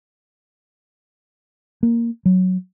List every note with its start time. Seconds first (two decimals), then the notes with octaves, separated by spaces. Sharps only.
1.83 A#3
2.25 F#3